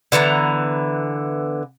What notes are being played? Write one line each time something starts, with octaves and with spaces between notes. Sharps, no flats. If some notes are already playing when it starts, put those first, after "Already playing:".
D3 E3 B3 A#5